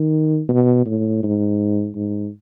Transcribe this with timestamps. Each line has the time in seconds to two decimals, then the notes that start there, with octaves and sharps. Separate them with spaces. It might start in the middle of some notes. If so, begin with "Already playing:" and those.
Already playing: D#3
0.49 B2
0.86 A2
1.23 G#2
1.96 G#2